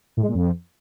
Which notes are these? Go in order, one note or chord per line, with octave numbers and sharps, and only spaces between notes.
A2
G#3
A#2
F2